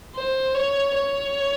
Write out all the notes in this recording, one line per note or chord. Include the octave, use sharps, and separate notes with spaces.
C5
C#5
C#5